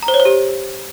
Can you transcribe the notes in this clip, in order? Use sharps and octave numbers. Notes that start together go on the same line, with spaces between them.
A#5
C5
C#5
C5
G4